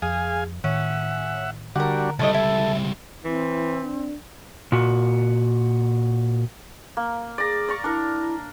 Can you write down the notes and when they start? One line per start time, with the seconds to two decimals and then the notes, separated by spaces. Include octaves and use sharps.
0.02 F2 G#4 F5 G#5
0.64 A2 D#3 C#4 E5 F#5
1.76 D3 G3 D4 F#4 A#4 F#5
2.19 C#2 A2 G3 A3 A4 D#5
2.34 E4
3.25 E3 C4 E4
3.83 D4
4.72 A#2 F#4
6.97 A#3
7.38 G#4 D5 A#5
7.68 D5 A#5 C#6
7.84 D4 E4 A#4